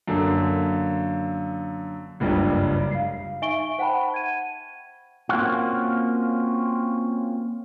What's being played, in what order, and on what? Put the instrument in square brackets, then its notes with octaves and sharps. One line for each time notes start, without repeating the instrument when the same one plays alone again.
[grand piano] F#2 D3 A#3 A4 F5
F#1 C#2 G2 G3
[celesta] F5 C7
D#4 E5 G#5 C#6 D7 G7
C5 F#5 G5 A5 B5
G#6 D#7
[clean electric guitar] A#3 C4 C#4 F4 F#4